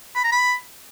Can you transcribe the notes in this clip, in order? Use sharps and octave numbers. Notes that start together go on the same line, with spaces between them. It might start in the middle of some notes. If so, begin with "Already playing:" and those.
B5
A#5
B5